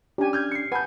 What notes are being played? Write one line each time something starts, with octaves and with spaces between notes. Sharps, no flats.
C#4 D4 G4 G#5
F6 G6 G#6
C7 C#7
B4 F#5 G#5 A5 G6